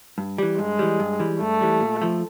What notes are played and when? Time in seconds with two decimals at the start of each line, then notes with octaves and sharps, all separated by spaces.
0.18 G2
0.38 E3 G3
0.59 G2 G#3
0.79 E3 G3
1.00 G2
1.19 E3 G3
1.40 G2 A3
1.61 E3 G3
1.81 A#2
2.02 F3 A3